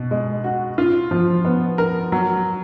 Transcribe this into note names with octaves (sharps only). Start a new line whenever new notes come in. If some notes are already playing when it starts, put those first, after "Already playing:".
Already playing: B2
G#3
F#4
F4
F3
B3
A#4
F#3